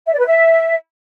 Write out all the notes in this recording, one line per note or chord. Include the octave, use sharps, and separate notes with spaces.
E5
D5
B4
E5